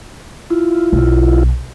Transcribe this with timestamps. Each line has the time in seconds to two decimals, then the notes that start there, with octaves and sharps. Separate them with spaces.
0.50 E4 F4
0.93 B1